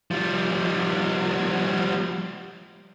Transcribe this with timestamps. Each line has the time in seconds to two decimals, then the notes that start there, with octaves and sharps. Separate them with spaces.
0.11 F3 G3